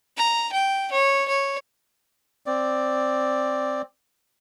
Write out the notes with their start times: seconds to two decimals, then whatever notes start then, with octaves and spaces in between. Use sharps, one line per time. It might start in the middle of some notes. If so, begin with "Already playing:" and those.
0.17 A#5
0.52 G5
0.92 C#5
1.28 C#5
2.46 C4 D5